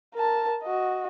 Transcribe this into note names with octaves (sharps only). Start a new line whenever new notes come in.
A#4 A5
F#4 D#5